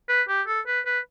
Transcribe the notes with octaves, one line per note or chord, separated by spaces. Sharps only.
B4
G4
A4
B4
B4